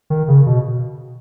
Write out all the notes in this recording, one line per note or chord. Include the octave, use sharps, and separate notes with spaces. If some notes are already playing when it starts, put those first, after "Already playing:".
D#3
C#3
B2